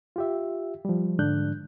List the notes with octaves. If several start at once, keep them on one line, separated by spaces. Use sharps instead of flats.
F4 G4 E5
F3 G3
G#2 D3 D4 F#6 G6